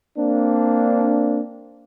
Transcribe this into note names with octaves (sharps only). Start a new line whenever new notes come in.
A#3 C4 D4